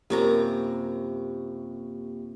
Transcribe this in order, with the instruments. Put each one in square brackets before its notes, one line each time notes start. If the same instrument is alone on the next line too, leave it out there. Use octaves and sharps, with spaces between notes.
[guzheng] F#2 C3 A#5 [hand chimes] A#3 F4 G4